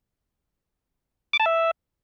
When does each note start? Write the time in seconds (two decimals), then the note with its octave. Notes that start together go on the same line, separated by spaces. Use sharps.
1.33 D6
1.40 A5
1.46 E5